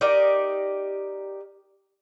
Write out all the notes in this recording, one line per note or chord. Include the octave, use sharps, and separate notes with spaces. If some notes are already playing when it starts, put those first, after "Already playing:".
D#4 G4 A#4 D5